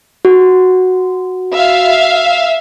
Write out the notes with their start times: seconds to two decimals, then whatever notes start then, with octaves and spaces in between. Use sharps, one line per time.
0.25 F#4
1.53 E5 F5